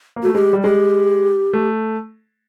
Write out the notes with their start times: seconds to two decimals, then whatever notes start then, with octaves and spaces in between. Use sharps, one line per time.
0.16 A#3
0.23 A3 F#4
0.35 G#3 G4
0.53 G3
0.64 G#3 G4
1.53 A3